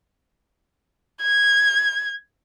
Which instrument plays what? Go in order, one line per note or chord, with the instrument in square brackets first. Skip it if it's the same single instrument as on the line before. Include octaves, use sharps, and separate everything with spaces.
[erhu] G#6